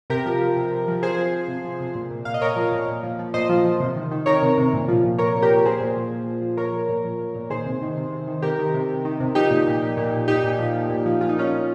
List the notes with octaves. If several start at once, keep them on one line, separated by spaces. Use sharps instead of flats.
C3 G4 A#4
F3
F3
C3
C3
F3
C3 G#4 C5
F3
F3
C3
F3
C3
A#2
A#2
A#2 F5
D#5
A#2 A#4 C#5
F3
A#2
A#2
F3
F3
A#2 C5 D#5
F3
F3
C3
D#3
D#3
D#3 A#4 C#5
C3
C3
A#2
F3
A#2
A#2 A#4 C#5
A#2
G4 A#4
A#2
A#2 G#4 C5
A#2
F3
F3
F3
F3
A#2 A#4 C#5
F3
A#2
F3
A#2
A#2
D#3 G#4 C5
C3
D#3
C3
C3
D#3
C3 G4 A#4
D#3
C3
C3
D#3
C3
F3 D#4 G4
A#2
A#2
A#2
A#2
A#2
A#2 D#4 G4
A#2
F3
F3
A#2
F3
A#2 F4
D#4
A#2 C#4 F4
F3